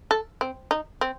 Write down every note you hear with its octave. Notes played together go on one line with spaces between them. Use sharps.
A4
C4
D#4
C4